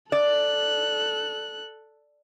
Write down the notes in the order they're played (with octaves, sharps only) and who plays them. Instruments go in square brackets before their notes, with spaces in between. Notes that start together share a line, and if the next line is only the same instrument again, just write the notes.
[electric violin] A4 F#6 [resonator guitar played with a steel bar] D5